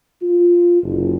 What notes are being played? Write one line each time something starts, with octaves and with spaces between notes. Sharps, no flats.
F4
F#1